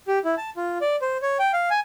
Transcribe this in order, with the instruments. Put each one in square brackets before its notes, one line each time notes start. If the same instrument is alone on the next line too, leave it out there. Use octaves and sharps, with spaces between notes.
[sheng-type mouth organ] G4
E4
A5
F4
D5
C5
C#5
G5
F5
G#5